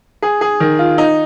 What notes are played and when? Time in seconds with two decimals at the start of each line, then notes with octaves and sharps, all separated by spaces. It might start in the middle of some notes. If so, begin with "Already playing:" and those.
0.22 G#4
0.41 G#4
0.60 D#3
0.79 F4
0.98 D#4